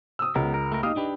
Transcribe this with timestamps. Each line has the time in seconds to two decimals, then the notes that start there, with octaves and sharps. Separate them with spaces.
0.19 D#6 E6
0.35 C#2 B3 A#4
0.54 A#4
0.72 A3 A#4
0.83 A#3 D#4 G4 F5 D#6
0.96 D4 G4 B4